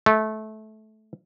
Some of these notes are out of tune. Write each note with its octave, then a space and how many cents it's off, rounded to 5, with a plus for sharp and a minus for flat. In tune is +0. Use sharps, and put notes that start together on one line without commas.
A3 -20